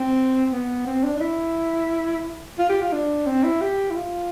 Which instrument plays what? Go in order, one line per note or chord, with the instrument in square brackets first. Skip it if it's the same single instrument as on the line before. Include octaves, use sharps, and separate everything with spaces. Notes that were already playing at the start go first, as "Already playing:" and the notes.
Already playing: [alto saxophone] C4
B3
C4
D4
D4
E4
F4
G4
F4
D4
C4
E4
G4
E4
F4